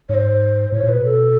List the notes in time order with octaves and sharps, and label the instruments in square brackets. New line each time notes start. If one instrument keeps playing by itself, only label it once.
[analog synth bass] G#2 [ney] C5 C#5
[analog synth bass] A2 [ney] C#5
[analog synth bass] A#2
[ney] B4
[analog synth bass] B2
[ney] A4